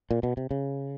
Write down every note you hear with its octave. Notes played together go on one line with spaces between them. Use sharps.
A#2
B2
C3
C#3